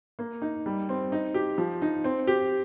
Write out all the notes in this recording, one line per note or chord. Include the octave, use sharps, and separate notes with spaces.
A#3
D#4
G3
C4
D#4
G4
F3
D#4
C4
G4